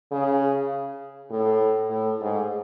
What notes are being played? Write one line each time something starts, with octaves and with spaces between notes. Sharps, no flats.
C#3
A2
A2
G#2